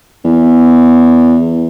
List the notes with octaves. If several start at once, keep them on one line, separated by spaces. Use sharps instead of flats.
E2